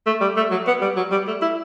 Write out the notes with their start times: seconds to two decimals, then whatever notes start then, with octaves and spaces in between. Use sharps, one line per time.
0.06 A3
0.21 G3
0.36 A3
0.51 F#3
0.67 B3
0.81 G3
0.96 F#3
1.11 G3
1.27 A3
1.42 E4